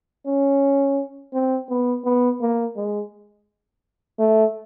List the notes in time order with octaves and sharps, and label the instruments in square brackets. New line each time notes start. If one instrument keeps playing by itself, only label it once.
[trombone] C#4
C4
B3
B3
A#3
G#3
A3